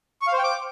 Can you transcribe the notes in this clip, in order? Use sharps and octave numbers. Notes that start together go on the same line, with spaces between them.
C#6
F5
C5
G5
D6